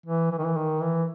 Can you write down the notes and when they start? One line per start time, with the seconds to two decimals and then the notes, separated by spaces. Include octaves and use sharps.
0.06 E3
0.31 E3
0.38 D#3
0.46 E3
0.57 D#3
0.83 E3